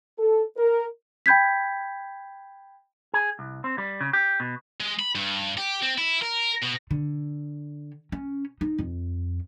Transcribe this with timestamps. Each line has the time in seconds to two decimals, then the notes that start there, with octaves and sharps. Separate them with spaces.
0.19 A4
0.57 A#4
1.26 G5 B5 G6 G#6 B6
3.14 G#4
3.39 C2
3.64 C4
3.78 G3
4.00 C#3
4.13 G4
4.40 B2
4.81 G#3
4.99 B5
5.15 G2
5.57 G4
5.82 C4
5.98 E4
6.22 A#4
6.63 B2
6.91 D3
8.12 C#4
8.61 D#4
8.78 F2